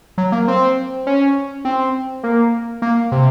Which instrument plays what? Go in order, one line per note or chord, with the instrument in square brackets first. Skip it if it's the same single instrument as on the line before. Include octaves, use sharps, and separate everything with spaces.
[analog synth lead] F#3
A#3
C4
C#4
C4
A#3
A#3
C3